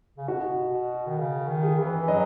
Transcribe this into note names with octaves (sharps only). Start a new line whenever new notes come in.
C#3
B2 F#4
B2
D#3
C#3
D#3
G#4
E3
B4
F#3 D#5